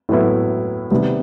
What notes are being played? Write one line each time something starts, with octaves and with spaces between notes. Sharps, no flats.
A2 F#3 B3 E4
C3 D#3 G3 B3